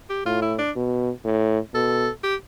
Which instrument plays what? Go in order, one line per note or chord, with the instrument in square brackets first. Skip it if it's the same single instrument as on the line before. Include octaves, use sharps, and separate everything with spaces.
[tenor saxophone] G4
[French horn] A2 [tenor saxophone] F4
[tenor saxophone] E4
D4
[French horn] B2
A2
[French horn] B2 [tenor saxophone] A4
[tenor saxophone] G4